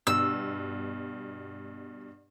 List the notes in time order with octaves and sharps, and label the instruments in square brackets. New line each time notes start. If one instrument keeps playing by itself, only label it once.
[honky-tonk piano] G2 B2 [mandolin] E6